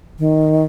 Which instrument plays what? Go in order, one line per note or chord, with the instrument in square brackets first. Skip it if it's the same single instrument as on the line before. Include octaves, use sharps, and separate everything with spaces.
[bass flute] D#3